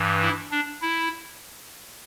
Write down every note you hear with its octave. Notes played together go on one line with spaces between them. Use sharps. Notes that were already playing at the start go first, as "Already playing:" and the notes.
Already playing: G2 E3
E4
D4
E4